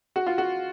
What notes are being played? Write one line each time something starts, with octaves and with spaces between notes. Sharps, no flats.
F#4
F4
F#4